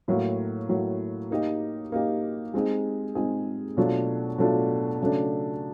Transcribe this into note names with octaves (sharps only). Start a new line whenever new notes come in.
A2 F#3 A#3
A2 F#3 A#3
A#3 D#4 G4
A#3 D#4 G4
G#3 C4 D#4 G#4
G#3 C4 D#4 G#4
B2 F#3 A3 D4 F4
B2 F#3 A3 D4 F4
C#3 F#3 A3 D4